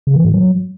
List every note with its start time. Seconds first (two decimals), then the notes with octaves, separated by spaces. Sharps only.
0.07 C#3
0.16 E3
0.25 G#2
0.34 F#3